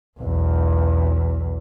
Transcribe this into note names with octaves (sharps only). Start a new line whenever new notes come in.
B1 E2